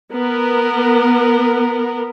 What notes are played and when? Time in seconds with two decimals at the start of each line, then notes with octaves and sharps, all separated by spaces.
0.14 B3 A#4